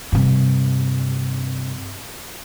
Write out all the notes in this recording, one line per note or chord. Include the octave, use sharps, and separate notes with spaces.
G2 C3